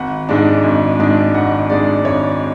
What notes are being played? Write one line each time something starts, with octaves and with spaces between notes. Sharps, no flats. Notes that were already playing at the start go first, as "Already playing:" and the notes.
Already playing: G#1 F#5
G#2 G#3 D4
G#1
G#2 G#3 D4
G#1 F#5
G#2 G#3 D4 D5
G#1 C#5